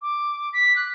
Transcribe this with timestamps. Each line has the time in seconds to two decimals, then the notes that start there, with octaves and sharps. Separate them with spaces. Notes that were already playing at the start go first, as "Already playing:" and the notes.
0.02 D6
0.53 B6
0.76 F#6